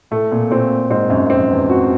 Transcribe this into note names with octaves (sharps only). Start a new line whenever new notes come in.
A2 A3
A#2
A#2 C4
G#2 C4
F#2
F#2
F2 C4
E2
F#4